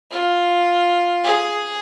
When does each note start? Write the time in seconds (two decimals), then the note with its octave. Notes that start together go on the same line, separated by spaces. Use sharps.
0.11 F4
1.24 G#4